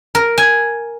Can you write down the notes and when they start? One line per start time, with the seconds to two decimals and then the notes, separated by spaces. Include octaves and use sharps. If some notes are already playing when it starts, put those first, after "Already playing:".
0.15 A#4
0.38 G#5